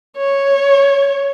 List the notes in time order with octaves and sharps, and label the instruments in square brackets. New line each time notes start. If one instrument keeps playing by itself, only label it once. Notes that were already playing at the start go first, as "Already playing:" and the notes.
[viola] C#5